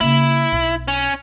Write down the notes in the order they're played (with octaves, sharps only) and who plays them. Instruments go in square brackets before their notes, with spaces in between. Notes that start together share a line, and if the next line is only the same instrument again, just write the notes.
[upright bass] C#3 A#3 [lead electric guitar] E4
[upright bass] B1
[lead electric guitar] C#4